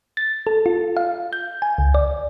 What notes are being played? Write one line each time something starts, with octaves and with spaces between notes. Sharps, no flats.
A6
A4
F4
F5
G6
G#5
C#2
D5